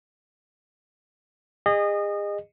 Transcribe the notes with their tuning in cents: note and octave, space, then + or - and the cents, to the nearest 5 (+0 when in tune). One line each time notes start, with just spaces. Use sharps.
G#4 -35 D#5 -25